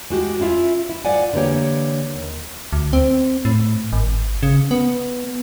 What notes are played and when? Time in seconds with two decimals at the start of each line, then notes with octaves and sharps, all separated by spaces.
0.10 G#3 F#4 G4
0.40 C#4 E4 F4 E5
0.89 E4
1.05 G#2 F4 D5 F#5 G#5
1.33 D3 E3 A#3 G4 C#5
2.14 D#2
2.73 D2
2.93 C4
3.45 A2
3.93 G#1
4.43 C#3
4.71 B3